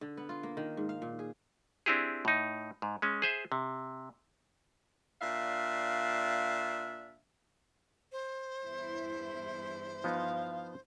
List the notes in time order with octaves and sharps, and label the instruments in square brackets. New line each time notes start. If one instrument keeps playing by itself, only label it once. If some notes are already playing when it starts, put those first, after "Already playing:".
[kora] D3
B3
F4
A#3
D#3
G#2
F5
A#2
G#4
[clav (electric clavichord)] C4 D4 E4 G4 G#4
A2 D#4
G#2
G#3 C#4
G#4 C5 E5
C3
[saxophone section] A#2 D4 E5 F5
[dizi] C5
[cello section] E2 G2 E4
[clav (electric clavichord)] F3 B3 D#4 [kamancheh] F5